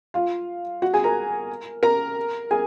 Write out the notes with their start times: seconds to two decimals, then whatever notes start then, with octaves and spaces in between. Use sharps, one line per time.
0.14 F4 F5
0.82 F#4 F#5
0.93 G#4 G#5
1.04 A#4 A#5
1.83 A#4 A#5
2.51 G#4 G#5